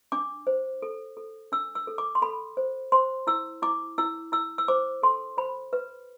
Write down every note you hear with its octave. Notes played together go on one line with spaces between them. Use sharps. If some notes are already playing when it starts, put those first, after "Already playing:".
D4 D6
C5
A4
A4
D4 E6
E6
A4
D6
C6
A4 B5
C5
C5 C6
E4 E6
E4 D6
E4 E6
E4 E6
E6
C5 D6
A4 C6
C5 B5
B4